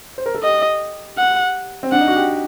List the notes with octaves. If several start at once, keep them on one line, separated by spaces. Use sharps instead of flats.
C5
A#4
A4
G4 D#5
F#5
C4
D4 F#5
D#4
F#4
G4